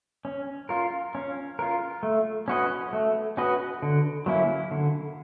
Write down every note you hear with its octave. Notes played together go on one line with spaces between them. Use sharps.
C#4
F4 A#4
C#4
F4 A#4
A3
C#4 F#4 B4 D#5
A3
C#4 F#4 B4 D#5
D3
F#3 A#3 C#4 E4
D3